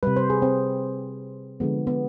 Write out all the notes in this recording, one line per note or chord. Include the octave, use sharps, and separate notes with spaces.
C3 G3 B4
C5
G#4
C4
D3 F3 G#3 B3
B3